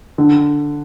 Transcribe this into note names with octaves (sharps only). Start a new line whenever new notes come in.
D3